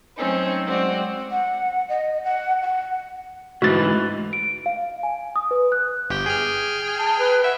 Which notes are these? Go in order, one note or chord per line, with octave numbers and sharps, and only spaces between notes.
F#3 A3 C4 C#4 D#4
F#3 G#3 C4 F#4 D5
F#5
D#5
F#5
F#5
D2 G#2 E3 F#4 A6
D7
F5
G#5
D#6
B4
F#6
G1 G4 G5
G#4 G5 F6
A5
B4
E5 F#5